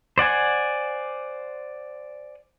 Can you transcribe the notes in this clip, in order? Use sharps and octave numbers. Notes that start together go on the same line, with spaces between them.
C5 D5 F#5 G#5